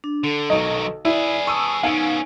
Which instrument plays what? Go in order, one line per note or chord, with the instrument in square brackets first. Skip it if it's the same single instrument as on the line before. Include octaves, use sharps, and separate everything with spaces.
[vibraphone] D4
[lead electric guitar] D3 [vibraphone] A4
[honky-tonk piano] B1 D#4 D#5 [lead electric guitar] D#3 F#3
[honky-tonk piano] E4 [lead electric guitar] G#4 B4 [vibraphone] D5
[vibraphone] A5 D#6 [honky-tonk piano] C#6 E6 D#7
[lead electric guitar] B3 C#4 [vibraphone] D#4 [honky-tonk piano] F5 G#5 D7